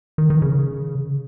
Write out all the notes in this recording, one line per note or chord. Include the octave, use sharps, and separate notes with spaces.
D#3
D#3
C#3